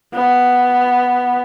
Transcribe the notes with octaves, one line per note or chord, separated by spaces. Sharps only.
B3